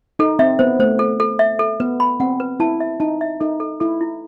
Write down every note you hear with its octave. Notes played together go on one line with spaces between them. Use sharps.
D#4 A4
C4 E5
B3 C5
A3 C5
A4
A4
E5
A4
B3 B4
B5
C4 F#5
B4
E4 A5
E5
D#4 A5
E5
D#4 A4
A4
E4 A4
E4